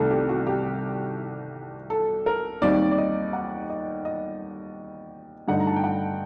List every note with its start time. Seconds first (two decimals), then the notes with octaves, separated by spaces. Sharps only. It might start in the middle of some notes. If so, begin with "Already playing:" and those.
Already playing: C2 C3 D#3 A3 A4
0.11 G4
0.29 F#4
0.47 G4
1.90 A4
2.26 A#4
2.62 D#2 D#3 G3 C4 D#4 D5
2.91 D5
2.98 D#5
3.33 F#5
3.70 D#5
4.05 D#5
5.48 G2 D3 A3 D#4 F#5
5.60 A#5
5.67 A5
5.76 G5
5.84 F#5